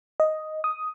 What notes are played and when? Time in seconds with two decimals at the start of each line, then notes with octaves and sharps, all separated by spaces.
0.20 D#5
0.64 D#6